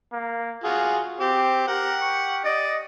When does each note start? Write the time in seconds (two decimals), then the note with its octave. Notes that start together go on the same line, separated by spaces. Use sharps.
0.12 A#3
0.64 F4 F#4 G#4
1.20 C4 G4
1.68 G4 A#4 F#5
2.01 C#6
2.44 D5 D#5